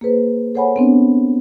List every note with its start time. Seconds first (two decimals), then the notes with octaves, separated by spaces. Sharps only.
0.01 A#3 G#4 B4 C5
0.55 A4 C5 C#5 F#5 G#5 B5
0.76 B3 C4 D4